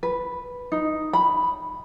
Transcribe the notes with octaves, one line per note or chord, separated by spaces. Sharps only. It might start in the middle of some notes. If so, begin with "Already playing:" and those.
B4
D#4
B5